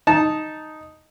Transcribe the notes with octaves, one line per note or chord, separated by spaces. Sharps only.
D#4 A5